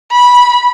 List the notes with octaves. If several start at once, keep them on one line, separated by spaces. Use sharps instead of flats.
B5